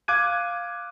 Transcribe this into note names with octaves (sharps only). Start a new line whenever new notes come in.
F5 D6 F#6 G#6 D#7